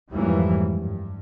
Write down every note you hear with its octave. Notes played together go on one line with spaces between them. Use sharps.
F2 G#2 E3 F#3 G3 A#3
G2